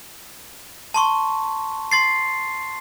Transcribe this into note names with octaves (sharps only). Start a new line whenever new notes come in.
A5 C6 C#6
C6 A6 C7